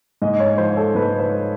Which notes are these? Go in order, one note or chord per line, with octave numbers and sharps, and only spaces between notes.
G#2 D#5
C#5
F3 C5
A4
G#2 B4
C5